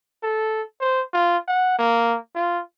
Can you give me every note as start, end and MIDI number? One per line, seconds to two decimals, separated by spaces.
0.23 0.62 69
0.81 1.02 72
1.14 1.38 65
1.48 1.74 78
1.79 2.18 58
2.35 2.61 65